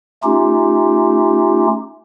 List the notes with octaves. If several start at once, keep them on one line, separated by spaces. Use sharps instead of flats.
A3 C#4 D#4 F4 G4